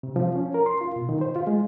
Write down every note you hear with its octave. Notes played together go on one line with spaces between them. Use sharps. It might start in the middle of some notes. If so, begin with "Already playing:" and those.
C3
F3
C#4
A#4
C6
F4
B2
D#3
C5
F4
G#3